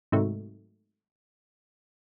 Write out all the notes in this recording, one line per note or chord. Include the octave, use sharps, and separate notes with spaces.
G#2 C3 D#3 F#3 A3